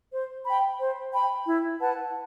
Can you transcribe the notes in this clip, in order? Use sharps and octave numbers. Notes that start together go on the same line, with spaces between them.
C5
G5 B5
C5
G5 B5
E4
B4 F#5 A5